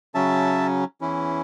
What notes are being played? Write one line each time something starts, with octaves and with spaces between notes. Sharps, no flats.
C#3 F#3 C#4 E5 A5
E2 E3 C#4 E4